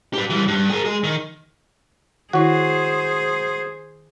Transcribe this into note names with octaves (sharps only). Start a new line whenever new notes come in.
G4 B4
E3 G3
G2
G#4 A#4
G#3 G#4
D#3
D#3 E4 F#4 G#4 C5 C#5